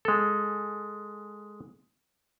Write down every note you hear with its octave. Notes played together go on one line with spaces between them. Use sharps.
G#3 A4